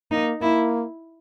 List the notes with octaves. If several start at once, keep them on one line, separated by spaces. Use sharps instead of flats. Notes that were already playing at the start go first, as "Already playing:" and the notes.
A#3 D#4
A#3 E4